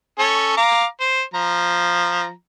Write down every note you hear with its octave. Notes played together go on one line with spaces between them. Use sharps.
C#4 A4 C#5
F5 A#5 D6
C5
F3 A#5